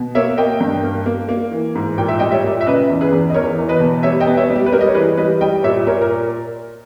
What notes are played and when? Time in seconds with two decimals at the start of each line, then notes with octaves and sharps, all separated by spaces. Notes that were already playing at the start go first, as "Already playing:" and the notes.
Already playing: B2
0.15 A#3 C#5 E5
0.37 A#3 D#5 G5
0.60 G2
0.83 A#3
1.06 A#3
1.29 A#3
1.51 E3
1.75 G#2
1.98 A#2 G5
2.08 E5
2.19 G3 D#5 G5
2.31 C#5 E5
2.44 A#2
2.61 E5
2.67 C#3 B4 D#5
2.89 E2
3.01 G#4 B4
3.12 E2
3.30 D#5
3.34 E2 A#4 C#5
3.58 E2
3.69 B4 D#5
3.80 B2
4.03 G3 C#5 E5
4.20 D#5 G5
4.27 B3
4.37 C#5 E5
4.50 G3
4.56 G4
4.66 B4
4.72 G3 G4 A#4
4.81 D#5
4.87 C#5
4.95 E3 G#4 B4
5.17 G3 B4 D#5
5.41 G3 D#5 G5
5.63 A#2 C#5 E5
5.87 A#2 A#4 C#5
6.01 A#4